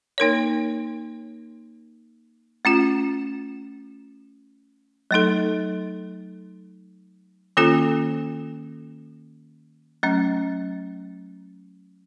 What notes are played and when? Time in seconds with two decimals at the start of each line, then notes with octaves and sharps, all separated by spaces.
0.18 A#3 D#4 A#4 C#5
2.65 A3 C#4 F4
5.11 F#3 A3 D#4 A4
7.57 D#3 A#3 C#4 F4 A4
10.03 F#3 A3 C#4